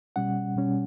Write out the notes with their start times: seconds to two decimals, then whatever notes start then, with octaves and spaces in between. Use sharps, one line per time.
0.16 B2 G3 C#4 F#5
0.56 B2 G3 C#4